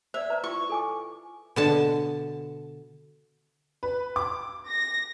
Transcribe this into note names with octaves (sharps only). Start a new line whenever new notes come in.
C5 D5 E5
B4 A#5
E4 F4 C#6
A4 G#5 D6
B2 D3 A5
B4
D6
A#6